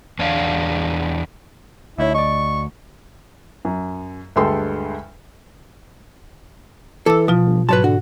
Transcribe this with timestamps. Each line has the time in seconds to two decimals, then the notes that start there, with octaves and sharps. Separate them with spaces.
0.19 E2 D4 C#5 F5
1.98 D2 D#4 E4 C#5 E5
2.14 D5 D#5 C#6
3.65 F#2
4.36 D2 G2 G#3 A4 G5 C6
7.06 E3 A4 D6 E6
7.28 B2 F3 F4
7.46 G1
7.69 G#2 F#3 B4 C#5 A5
7.84 D3 F#4